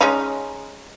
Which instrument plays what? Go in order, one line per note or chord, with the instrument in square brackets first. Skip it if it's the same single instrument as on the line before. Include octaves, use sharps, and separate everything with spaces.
[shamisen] G#3 C#4 D#4